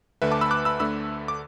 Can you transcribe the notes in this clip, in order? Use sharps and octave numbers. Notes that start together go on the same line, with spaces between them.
D2 D3 A3 B4 E5
A5 D6
B5 E6
D6 F#6
B5 E6
D2 D3 A3 B5 E6
D6